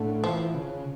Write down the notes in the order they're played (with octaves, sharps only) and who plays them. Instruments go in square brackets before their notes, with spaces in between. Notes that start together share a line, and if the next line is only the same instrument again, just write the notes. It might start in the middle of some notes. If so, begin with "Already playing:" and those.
Already playing: [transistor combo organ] A2 [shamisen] D3
[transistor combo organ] E3 [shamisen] F3
[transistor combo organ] C#3